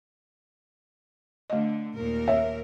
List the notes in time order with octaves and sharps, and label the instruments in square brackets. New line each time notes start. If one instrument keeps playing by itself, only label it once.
[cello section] D3 [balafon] A3 D#5
[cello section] D#2 A#2 A#4
[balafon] C#5 [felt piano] E5